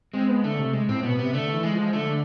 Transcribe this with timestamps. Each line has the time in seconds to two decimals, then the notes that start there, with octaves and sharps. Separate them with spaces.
0.14 G#3 C4
0.28 B3
0.44 D3 A3
0.59 C3
0.73 G#3
0.89 A2 C4
1.03 B2 B3
1.18 C3 B3
1.34 D3 A3
1.53 E3
1.63 G#3
1.73 F3
1.93 D3 A3